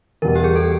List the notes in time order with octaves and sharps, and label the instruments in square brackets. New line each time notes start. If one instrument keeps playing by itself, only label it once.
[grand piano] E2 B2 G3 [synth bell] A#4
[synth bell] G4
G#4
A4